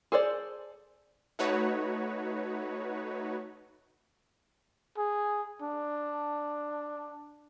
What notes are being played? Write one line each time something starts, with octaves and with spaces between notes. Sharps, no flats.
G#4 A4 C5 D5
A3 D#4 F#4 B4 C#5
G#4
D4